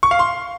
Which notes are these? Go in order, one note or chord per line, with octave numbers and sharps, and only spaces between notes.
C#6
F5
C6